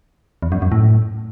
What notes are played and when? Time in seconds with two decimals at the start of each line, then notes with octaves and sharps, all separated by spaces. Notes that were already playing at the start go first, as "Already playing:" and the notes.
0.42 E2
0.52 F#2
0.62 F#2
0.72 A2